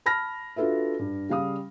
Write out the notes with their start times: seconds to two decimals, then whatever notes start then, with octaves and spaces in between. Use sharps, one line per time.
0.06 A5 B5 F6 A#6
0.56 D4 F4 F#4 A4 B4 E5
0.99 G2
1.29 C#3 G3 F5 D#6